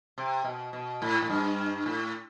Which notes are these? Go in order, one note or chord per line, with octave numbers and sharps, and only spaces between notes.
C3
B2
B2
A2
A2
G2
A2